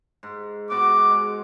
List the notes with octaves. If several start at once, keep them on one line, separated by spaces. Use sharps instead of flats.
G#2
G#2 B3 F#4 D6
G#3